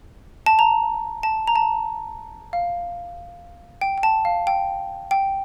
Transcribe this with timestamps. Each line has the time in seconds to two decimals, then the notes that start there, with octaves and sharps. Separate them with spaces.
0.46 A5
0.59 A#5
1.23 A5
1.48 A#5
1.56 A5
2.53 F5
3.82 G5
3.98 G5
4.03 A5
4.25 F5
4.47 G5
5.11 G5